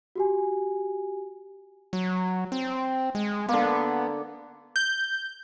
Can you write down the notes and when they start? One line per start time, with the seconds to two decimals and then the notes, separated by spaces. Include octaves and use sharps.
0.16 F#4 G4 G#5
1.93 F#3
2.52 C4
3.15 G#3
3.49 D3 A#3 B3
4.76 G6